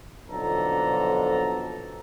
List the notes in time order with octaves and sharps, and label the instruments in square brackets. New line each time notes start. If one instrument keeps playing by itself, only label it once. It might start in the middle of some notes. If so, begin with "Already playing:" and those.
[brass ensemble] B1 F2 D3 A4 A#5